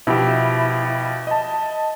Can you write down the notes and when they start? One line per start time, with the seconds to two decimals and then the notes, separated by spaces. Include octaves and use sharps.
0.07 B2 F3 E4 G4
1.27 D#5 A5